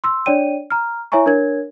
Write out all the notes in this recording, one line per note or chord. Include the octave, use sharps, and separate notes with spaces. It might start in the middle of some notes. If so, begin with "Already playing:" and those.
C6 E6
D4 C#5 D5 G5 D#7
A#5 F6
E4 C#5 E5 G#5 A#5 C#6
D4 A#4 C#5 G#6